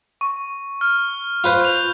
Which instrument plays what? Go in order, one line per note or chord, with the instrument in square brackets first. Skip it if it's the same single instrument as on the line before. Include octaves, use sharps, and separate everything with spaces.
[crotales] C#6
F6
[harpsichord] F4 B4 C5
[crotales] G6 F7